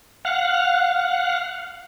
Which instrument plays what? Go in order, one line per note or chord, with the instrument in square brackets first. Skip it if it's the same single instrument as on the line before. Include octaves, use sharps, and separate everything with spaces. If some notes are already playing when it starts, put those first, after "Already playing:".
[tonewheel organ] F5 F#5